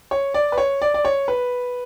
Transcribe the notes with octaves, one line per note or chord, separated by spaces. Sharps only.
C#5
D5
B4
C#5
D5
D5
C#5
B4